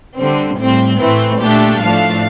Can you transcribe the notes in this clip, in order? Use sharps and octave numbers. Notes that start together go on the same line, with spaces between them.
D3 G3 C4
A2 G3 C4
A2 E3 A3 C4
A#2 A3 D4 G4
A2 F3 A3 D4 F5